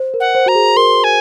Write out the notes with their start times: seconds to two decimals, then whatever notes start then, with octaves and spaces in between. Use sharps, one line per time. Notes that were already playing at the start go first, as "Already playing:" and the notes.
Already playing: C5
0.14 A#4
0.20 F#5
0.35 C5
0.46 F#4 A#5
0.55 G#4
0.76 A#4 C6
1.04 G#5